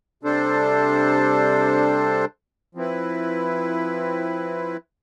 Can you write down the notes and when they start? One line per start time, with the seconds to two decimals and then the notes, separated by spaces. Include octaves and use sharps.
0.23 C3 G3 D4 A4 C5
2.75 F3 C4 E4 B4